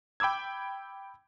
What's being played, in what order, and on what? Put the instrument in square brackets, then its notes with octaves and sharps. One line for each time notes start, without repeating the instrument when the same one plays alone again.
[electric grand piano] G5 B5 D6 E6 G#6